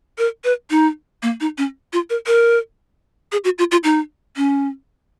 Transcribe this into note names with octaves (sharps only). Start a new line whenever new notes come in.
A#4
B4
D#4
A#3
D#4
C#4
F4
A#4
A#4
G#4
F#4
F4
F4
D#4
C#4